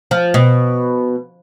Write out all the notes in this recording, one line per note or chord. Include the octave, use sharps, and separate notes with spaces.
F3
B2